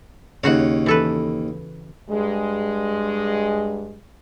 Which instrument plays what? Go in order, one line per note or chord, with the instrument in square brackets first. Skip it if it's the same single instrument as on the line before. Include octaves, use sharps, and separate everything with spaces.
[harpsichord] D#2 C#5 [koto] C#3 F#4 F#5
[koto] E3 A4 B4
[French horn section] G2 G#3